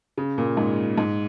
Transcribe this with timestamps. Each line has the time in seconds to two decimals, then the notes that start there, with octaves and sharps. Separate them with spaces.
0.18 C#3
0.38 A#2
0.57 G#2
0.98 G#2